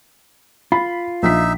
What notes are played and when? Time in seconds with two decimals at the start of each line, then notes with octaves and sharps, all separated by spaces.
0.72 F4 B5
1.23 A#1 D#4 E5 B6